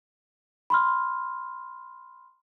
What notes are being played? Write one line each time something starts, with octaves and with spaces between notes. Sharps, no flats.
B5 C6 F6